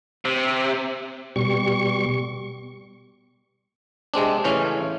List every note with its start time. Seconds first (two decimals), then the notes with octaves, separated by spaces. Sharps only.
0.25 C3
1.36 B2 G3 C#6
4.14 C3 G#3 C4 D4
4.44 A2 C#3 E3 C#4